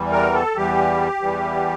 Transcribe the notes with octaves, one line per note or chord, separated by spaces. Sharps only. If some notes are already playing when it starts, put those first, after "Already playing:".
Already playing: E2 E3 G3
A#4
A4
E2 E3 G3 G4
E2 E3 G3